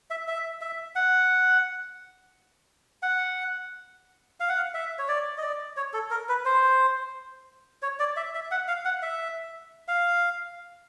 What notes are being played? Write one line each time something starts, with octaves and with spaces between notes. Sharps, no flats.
E5
E5
E5
F#5
F#5
F5
F#5
F5
E5
C#5
D5
D#5
D5
C#5
A4
A#4
B4
C5
C#5
D5
E5
E5
F#5
F5
F#5
E5
F5